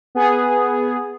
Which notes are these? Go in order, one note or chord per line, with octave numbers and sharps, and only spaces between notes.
B3 G#4